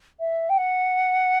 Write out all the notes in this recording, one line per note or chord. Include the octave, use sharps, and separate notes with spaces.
E5
G5
F#5